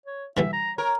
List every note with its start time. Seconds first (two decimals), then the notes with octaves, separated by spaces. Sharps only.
0.06 C#5
0.37 D3 E3 G3 E5
0.53 A#5
0.78 A#4 C#5